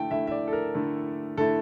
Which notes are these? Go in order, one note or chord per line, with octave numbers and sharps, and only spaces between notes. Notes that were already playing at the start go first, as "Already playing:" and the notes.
Already playing: D3 A3 E4 G5 A5
D3 A3 E4 E5
E5
D5
A4
A#4
D3 A3 E4
D3 A3 E4 A4